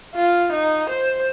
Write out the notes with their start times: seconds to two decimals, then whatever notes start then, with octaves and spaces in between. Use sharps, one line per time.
0.15 F4
0.52 D#4
0.89 C5